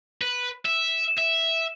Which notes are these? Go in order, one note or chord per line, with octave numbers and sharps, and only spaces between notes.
B4
E5
E5